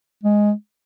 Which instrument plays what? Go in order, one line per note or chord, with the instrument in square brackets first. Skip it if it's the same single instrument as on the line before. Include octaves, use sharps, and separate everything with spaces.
[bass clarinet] G#3